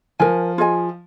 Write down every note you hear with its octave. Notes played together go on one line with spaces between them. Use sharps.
F3 A#4 G#5
F4 G#4 D#5 G#5